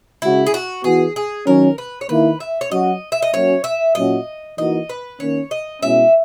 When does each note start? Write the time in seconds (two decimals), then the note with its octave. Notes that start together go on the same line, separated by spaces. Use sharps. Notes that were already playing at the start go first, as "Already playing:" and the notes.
0.22 C#3 G#3 C#4 E4 F#4
0.46 G#4
0.54 F#4
0.84 E3 B3 F#4 G#4
1.16 G#4
1.47 D#3 F#3 C#4 A#4
1.78 B4
2.01 C#5
2.09 D#3 A#3 E4 B4
2.40 E5
2.61 C#5
2.71 F#3 C#4 F#4 D#5
3.12 E5
3.22 D#5
3.33 F#3 A#3 C#4 F#4 C#5
3.64 E5
3.95 A#2 F#3 C#4 F#4 D#5
4.58 E3 A#3 D#4 F#4 D#5
4.90 B4
5.20 D#3 A#3 C#4 C#5
5.51 D#5
5.83 B2 G#3 C#4 E4 E5